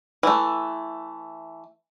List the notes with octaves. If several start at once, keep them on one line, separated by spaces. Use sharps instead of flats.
E3 A3